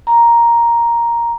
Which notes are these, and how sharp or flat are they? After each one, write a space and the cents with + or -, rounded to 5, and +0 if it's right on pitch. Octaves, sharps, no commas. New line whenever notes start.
A#5 +5